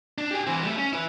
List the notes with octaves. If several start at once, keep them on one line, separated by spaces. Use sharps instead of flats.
D4
G4 G#4
E3 C4
G3 A3
C#4
E4 B4